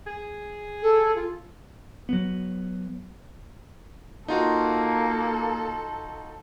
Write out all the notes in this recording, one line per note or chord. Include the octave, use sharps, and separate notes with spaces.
G#4
A4
F4
F#3 B3
A#3 D#4 F4 F#4 A4